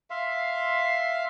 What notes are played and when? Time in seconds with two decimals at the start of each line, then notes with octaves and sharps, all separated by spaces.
0.10 E5 F5 C6